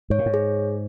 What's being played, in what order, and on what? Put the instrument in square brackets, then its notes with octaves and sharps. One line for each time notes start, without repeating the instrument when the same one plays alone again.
[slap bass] G#2 [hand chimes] C#5
[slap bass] A#2
G#2
[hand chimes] G#4